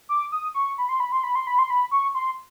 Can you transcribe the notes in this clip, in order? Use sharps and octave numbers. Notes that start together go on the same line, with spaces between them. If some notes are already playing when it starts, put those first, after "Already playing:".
D6
D#6
C#6
B5
C6
B5
C6
B5
C6
B5
C6
B5
C#6
C6